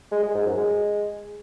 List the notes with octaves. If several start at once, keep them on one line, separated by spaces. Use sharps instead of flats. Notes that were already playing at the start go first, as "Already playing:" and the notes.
G#3
G#3
G#2
F#2
G#3